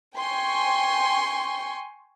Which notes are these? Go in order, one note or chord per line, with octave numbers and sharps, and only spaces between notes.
G5 G#5 C6 C#6